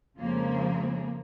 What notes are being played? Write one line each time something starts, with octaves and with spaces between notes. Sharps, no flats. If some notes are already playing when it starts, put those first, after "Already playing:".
F2 C#3 F3 G#3 A#3